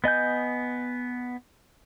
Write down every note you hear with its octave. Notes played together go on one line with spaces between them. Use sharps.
B3 D#5 G#5 G6